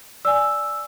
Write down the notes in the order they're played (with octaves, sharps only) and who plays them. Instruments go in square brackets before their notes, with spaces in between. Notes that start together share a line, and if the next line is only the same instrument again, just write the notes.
[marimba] D5 G#5 [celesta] E6